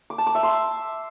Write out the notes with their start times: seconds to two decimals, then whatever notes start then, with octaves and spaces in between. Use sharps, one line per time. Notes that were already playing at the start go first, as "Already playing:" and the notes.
0.10 D6
0.18 A5
0.27 D6
0.35 E5
0.43 C6